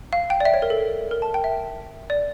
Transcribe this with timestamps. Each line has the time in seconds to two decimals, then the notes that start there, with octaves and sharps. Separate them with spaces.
0.13 F5
0.30 G5
0.40 D5
0.45 E5
0.54 C#5
0.62 A#4
0.70 A4
1.11 A#4
1.22 A5
1.34 G5
1.44 E5
2.10 D5